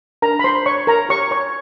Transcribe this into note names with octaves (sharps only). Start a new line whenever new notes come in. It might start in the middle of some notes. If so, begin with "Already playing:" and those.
D4 A#4 A#5
B5
C5 C6
C5 C#5 C#6
A#4 A#5
G4 C#5 C#6
C#5 C#6